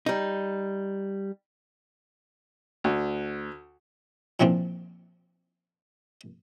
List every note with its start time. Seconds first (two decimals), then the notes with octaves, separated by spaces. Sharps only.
0.06 G3 D#4
2.84 D2
4.40 A#2 E3 F3 C4 D4 F4